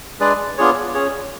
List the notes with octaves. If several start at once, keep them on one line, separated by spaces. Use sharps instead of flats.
G#3 D4 G#4 B4 D5
B3 D4 F4 G#4 C#5
C#4 G#4 C#5